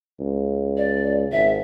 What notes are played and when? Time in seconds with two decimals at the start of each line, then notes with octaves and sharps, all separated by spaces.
0.20 C#2
0.77 D5
1.32 G#1 E5